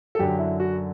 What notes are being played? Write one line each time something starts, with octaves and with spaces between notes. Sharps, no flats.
A4
F#2 D3 F#3 G4
E4
F#4